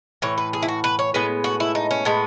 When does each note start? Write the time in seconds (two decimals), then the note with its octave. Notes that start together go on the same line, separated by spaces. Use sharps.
0.22 A2 E3 C#5
0.38 B4
0.53 G#4
0.63 E4
0.68 F#4
0.84 B4
0.99 C#5
1.14 A2 G#3 B3 B4
1.44 F#4
1.60 E4
1.75 D#4
1.91 C#4
2.05 A2 G#3 B3